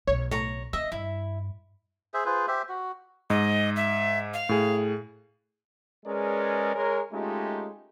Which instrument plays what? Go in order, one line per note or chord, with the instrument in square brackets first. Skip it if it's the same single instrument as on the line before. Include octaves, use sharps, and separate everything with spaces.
[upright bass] B1 [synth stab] C#5
[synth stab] A2 [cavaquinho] C#5 A#5
[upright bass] C4 [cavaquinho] D#5 [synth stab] E5
[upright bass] G2 [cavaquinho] E4
[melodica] G#4 C5 E5
F4 G#4 B4 C5
G4 C5 E5
F#4
[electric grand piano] G#2 [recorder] D#5
[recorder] E5
F5
[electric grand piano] A2 G#4
[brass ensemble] G#3 C#4 G#4 A#4 B4 D5
G#3 A#4 C#5
G#3 A3 C#4 D#4 F4 G4